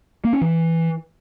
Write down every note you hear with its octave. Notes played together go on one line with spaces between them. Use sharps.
A#3
C#4
E3